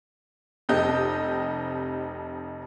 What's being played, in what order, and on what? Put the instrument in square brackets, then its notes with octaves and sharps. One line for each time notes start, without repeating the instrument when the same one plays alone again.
[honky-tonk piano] F1 C4 G4 A4 D#5 G6